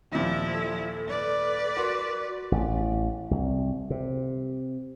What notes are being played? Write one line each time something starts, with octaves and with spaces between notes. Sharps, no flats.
D#2 A#2 F3 E4
A4
B4 D5
F#4 A#4 C6
A1
C2
C3